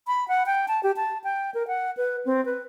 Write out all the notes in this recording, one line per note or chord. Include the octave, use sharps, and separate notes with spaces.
B5
F#5
G5
A5
G4
A5
G5
A#4
F#5
B4
C4
B4